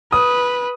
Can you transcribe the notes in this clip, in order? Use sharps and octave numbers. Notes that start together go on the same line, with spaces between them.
B4 D#6